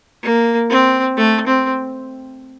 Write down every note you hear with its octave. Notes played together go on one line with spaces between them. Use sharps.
A#3
C4
A3
C4